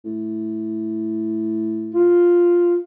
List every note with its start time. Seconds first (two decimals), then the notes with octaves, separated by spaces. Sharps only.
0.05 A2
1.95 F4